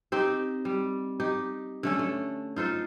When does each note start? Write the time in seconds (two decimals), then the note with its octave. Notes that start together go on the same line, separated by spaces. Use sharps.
0.12 C4 D#4 G4
0.65 G3
1.20 D#4 G4
1.83 D3 A3 C#4
1.99 A3
2.56 D#4 F4 A4 C5